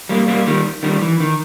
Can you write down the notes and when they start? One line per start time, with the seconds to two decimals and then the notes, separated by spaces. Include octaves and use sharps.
0.09 G3 A#3
0.28 G3 A#3
0.47 D#3 G3
0.83 D#3 G3
1.02 E3
1.20 D#3